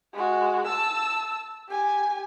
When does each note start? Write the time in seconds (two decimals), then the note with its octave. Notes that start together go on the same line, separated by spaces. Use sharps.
0.13 G#3 F#4
0.67 A5 E6
1.69 G4 G#5